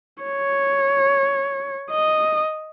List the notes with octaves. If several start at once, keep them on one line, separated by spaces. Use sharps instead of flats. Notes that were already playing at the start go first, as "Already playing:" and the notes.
C#5
D#5